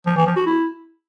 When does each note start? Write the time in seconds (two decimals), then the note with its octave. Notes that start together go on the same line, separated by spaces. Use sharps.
0.06 F3
0.16 E3
0.26 F3
0.36 F#4
0.46 E4